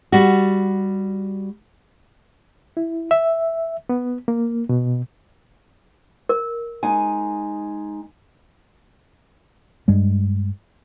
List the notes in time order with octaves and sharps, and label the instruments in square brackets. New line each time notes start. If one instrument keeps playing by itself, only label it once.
[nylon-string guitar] G3 F#4
[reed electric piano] E4
E5
B3
A#3
B2
[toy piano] A#4
[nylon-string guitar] G#3 D#4 G#5
[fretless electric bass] G2 G3 G#3